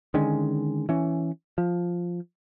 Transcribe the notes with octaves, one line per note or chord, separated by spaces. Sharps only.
D3 D#3 G#3 C#4
E3 C#4
F3